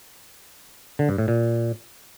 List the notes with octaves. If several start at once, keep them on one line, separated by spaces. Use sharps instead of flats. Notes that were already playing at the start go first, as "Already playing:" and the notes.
D3
G2
A2
A#2